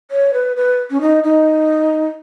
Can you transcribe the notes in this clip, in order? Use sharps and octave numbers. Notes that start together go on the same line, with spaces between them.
C#5
B4
B4
C#4
D#4
D#4